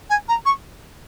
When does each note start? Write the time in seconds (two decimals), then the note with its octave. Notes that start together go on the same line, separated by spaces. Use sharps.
0.10 G#5
0.28 A#5
0.45 C#6